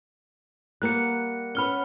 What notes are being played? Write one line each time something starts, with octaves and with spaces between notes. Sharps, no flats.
G3 A#3 F#5 F#6 C#7
B3 C#4 B5 F6 G7